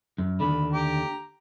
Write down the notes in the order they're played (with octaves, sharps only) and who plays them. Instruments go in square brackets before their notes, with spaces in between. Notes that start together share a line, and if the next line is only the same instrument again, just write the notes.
[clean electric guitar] F#2
[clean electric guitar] D#2 D3 [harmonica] B5
[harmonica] G4 A#5